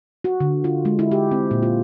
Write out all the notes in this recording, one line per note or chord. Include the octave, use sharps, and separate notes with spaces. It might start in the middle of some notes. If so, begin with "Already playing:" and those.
F#4
D3
F4
G#3
E4
G4
C4
A#2
F4